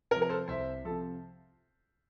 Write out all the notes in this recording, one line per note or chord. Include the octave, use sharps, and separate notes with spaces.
C3 A#4
F3
A#4
A4 C5
C2 C5 E5
C3 F3 A4